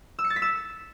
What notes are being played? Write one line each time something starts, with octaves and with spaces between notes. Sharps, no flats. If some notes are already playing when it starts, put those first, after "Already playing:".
E6
C#7
A6
B6
E6